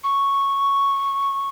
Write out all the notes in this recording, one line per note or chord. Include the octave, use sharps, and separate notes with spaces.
C#6